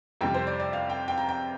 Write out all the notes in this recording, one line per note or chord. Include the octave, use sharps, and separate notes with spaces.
F2 C3 G3 G5
C5
D5
D5
F5
G5
G5
A#5
G5